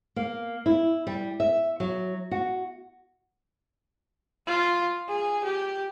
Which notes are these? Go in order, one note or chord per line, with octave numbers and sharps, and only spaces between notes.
A#3
E4
G3
E5
F#3
F#4
F4
G#4
G4